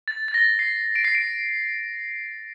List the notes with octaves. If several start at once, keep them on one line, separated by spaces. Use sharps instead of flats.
A6
A6
A#6
C7
D7
C7
D7